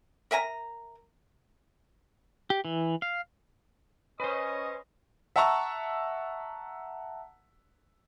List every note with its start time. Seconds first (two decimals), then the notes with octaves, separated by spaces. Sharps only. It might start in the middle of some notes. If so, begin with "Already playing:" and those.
0.31 A#4 E5 G#5 A#5
2.50 G4
2.65 E3
3.02 F5
4.20 C#4 B4 C5 D#5
5.36 E5 F#5 A5 A#5 C#6 E6